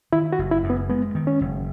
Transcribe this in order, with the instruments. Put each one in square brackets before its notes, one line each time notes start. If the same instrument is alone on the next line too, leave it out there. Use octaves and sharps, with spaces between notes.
[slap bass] D#3 [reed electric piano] E4
[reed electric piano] F#4
[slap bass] F#1
[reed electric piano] E4
[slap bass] F#2
[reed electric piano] B3
[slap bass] G#3 [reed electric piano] B3
[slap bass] D#3
[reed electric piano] C#4
[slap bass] F#1